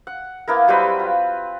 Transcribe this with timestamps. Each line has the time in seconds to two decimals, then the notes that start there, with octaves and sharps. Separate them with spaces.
0.07 F#5
0.48 A#3 B3 E4 A#4
0.68 F#3 G3 C4 B4
0.99 F4